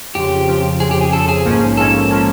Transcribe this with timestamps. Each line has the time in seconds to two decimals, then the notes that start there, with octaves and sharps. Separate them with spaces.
0.15 F2 C#3 F3 G4
0.48 F2 C#3 F3
0.80 F2 C#3 F3 G#4
0.91 G4
1.01 G#4
1.12 F2 C#3 F3 A4
1.28 G#4
1.45 A#1 G#2 F3 A#3 C#4
1.77 A#1 G#2 F3 A#3 C#4 A4
2.10 F3 A#3 C#4